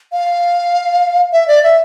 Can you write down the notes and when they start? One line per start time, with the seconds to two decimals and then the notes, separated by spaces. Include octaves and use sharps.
0.12 F5
1.33 E5
1.48 D5
1.63 E5